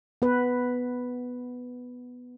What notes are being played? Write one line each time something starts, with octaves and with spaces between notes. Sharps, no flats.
B3 B4